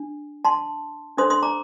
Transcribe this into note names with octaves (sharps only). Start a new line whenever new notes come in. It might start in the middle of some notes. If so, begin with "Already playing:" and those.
Already playing: D4
A5 C6
D4 A4 C5 C6 D#6
C6 D#6
A#5 D6